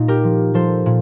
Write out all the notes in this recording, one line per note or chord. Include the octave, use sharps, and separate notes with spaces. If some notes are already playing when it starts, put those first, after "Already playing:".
Already playing: A#2 D#4
G4 A#4
F3
F3 A4 C5
A#2